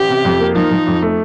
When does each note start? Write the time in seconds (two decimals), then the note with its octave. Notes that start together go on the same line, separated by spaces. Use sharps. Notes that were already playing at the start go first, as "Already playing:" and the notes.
Already playing: A1 G4
0.09 C3
0.25 F2
0.40 A#3
0.55 F3 D#4
0.71 F3
0.87 F2
1.02 A3